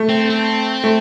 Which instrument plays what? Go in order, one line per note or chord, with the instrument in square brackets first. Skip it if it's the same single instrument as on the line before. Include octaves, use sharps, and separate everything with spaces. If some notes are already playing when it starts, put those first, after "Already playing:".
Already playing: [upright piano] A3
[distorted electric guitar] C4
C4
[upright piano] A3